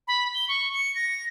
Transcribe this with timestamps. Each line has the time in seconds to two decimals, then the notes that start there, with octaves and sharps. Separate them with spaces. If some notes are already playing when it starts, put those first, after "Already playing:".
0.08 B5
0.35 G7
0.49 C#6
0.74 C#7
0.95 A#6